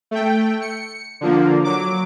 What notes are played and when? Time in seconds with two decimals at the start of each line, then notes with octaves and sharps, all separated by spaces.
0.11 A3 G5
0.62 C#7
1.21 D3 F3 A#3
1.64 F#3 D6